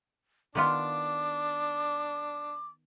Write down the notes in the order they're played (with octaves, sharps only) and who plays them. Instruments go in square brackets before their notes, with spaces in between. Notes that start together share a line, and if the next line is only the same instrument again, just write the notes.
[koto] D#3 B3 F4 [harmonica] D4 [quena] D6